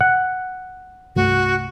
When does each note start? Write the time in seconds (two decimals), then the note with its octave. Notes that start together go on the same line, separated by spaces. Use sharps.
0.01 F#5
1.16 C2 G2 A3 F#4